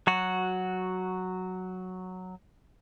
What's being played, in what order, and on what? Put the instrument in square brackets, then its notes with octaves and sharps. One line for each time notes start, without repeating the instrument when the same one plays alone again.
[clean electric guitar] F#3 F#4